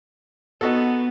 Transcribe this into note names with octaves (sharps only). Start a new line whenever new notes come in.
B3 D#4 F#4 A4